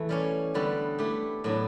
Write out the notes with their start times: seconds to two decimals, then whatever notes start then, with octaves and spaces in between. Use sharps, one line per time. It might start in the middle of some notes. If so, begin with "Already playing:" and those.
Already playing: E3 A3
0.09 G3 C#4 G4 C#5
0.54 D3 G3 B3 F#4 A4
0.99 A3 E4 G4
1.44 A2 F#3 B3 D4